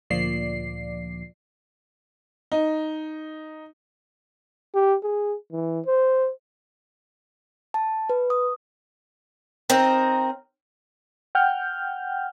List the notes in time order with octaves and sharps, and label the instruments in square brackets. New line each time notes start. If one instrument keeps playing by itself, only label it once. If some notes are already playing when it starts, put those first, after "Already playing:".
[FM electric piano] D2 A#2 F3 D5 C7
[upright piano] D#4
[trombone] G4
G#4
E3
C5
[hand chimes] A5
B4
D#6
[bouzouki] C4 D#4 A#4
[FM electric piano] F#5 G5 F6 G6